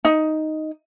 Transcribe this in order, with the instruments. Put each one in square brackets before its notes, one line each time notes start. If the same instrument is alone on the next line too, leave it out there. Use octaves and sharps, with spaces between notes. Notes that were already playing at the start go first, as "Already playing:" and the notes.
[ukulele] D#4